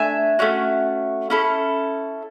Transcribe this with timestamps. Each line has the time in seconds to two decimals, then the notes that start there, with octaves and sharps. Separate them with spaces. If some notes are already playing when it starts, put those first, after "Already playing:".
Already playing: A3 D4 E5 G#5
0.39 A3 C#4 F#4
1.30 C#4 E4 A4